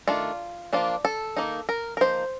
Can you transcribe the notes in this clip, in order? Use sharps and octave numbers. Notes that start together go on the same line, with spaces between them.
D#3 A3 D4 F4
F3 A#3 D4 F4
A4
D#3 A#3 D#4
A#4
A#4
F3 A#3 D#4 C5